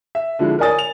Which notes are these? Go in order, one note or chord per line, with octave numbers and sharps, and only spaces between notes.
E5
D3 F3 G#3 E4
A#4 C#5 D5 G#5 D#6 A6
F7